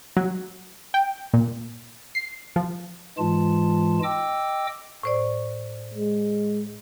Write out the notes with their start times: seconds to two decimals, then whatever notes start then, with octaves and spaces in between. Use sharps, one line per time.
0.17 F#3
0.94 G5
1.34 A#2
2.15 C7
2.56 F3
3.18 G#2 E3 G#3 F4 A5
4.03 D#5 G5 D6 E6
5.03 A2 C5 D5
5.94 G#3